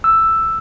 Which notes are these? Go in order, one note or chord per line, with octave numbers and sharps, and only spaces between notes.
E6